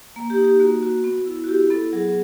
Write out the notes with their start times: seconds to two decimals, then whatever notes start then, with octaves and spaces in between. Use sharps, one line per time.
0.16 A#3
0.30 G4
0.37 D#4
0.45 G4
0.60 A#3 F#4
0.83 F#4
1.04 B3
1.26 E4
1.44 F#4
1.48 E4 G4
1.70 B3 A4
1.93 F#3 G#4